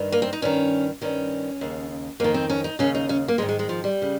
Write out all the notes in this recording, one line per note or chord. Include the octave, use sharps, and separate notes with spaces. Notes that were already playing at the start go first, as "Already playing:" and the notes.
Already playing: G2 D#3
A#3
C4
D#4
G2 D#3 C#4
G2 D#3 C#4
D#2 C#3
F2 D#3 A#3
C4
C#4
D#4
D#2 C#3 C#4
D#4
C#4
A#3
G#2 D#3 G#3
G#3
G#3
F3
G3
C#3